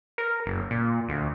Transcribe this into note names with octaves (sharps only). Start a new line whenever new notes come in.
A#4
F#1
A#2
D2